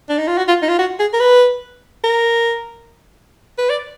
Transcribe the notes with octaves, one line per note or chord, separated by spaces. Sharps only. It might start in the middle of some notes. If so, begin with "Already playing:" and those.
D4
D#4
F4
F#4
F4
D#4
F4
F#4
G#4
A#4
B4
A#4
B4
D5